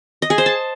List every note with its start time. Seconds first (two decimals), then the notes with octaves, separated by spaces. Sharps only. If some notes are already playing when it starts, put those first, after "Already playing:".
0.22 D#5
0.30 G#4
0.38 C5
0.46 A5